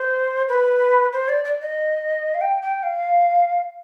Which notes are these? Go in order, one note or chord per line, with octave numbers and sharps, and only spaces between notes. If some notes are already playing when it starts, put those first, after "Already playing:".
Already playing: C5
B4
C5
D5
D5
D#5
F5
G5
G5
F5